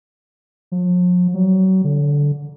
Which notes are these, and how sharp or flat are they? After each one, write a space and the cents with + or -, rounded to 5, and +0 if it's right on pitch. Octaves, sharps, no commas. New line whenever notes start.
F3 +45
F#3 +30
D3 -15